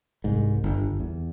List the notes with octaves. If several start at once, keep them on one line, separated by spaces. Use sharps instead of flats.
C2 G#2
G1
E2